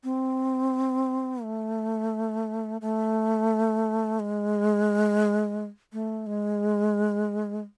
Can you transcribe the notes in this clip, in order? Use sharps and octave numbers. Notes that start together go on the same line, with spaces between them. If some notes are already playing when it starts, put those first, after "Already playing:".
C4
A3
A3
G#3
A3
G#3